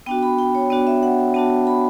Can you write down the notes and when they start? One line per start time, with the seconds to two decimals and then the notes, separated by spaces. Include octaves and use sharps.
0.06 B3 D4 F#4 G5
0.23 B5
0.39 G5
0.55 C#5
0.70 B3 D4 F#4 D5
0.87 E5
1.03 F#5
1.34 B3 D4 F#4 A5
1.67 B5